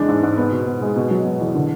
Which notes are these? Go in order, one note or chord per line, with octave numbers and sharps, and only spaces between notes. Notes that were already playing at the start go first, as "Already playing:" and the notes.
Already playing: E2 G#3 D4
G#2
G#2
B3
B2
B2
G#3
B2
F#3
B2
E2
D3